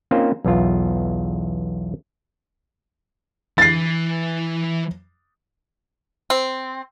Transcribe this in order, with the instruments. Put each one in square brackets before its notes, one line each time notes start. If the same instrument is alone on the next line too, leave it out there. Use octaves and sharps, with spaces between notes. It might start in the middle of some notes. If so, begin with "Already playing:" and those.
[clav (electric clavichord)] A#3 C4 C#4 D#4 F4 C5
B1 E2 E3 F4
[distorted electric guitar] E3 E4 [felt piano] A6 C7
[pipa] C4